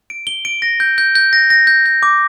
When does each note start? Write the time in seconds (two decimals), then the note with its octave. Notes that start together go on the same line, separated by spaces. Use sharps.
0.10 D7
0.27 G7
0.45 D7
0.62 A#6
0.80 G6
0.98 G6
1.15 G6
1.33 A#6
1.50 A#6
1.67 G6
1.86 G6
2.03 D6